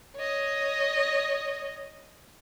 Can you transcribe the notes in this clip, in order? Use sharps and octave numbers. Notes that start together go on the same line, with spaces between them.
C#5 D#5